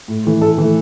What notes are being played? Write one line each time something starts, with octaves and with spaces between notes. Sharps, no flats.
A2
E3 A3
A2 A4
E3 A3